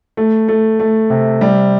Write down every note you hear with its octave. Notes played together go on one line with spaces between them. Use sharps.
A3
A3
A3
C3
G3